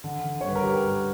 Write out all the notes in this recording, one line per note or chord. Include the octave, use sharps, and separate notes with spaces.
D3
D3
C#5
G2 B4
A#4
D3 G4
G2